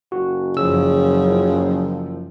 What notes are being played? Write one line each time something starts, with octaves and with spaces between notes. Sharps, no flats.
F#1 F#4
F#2 C#3 F3 E6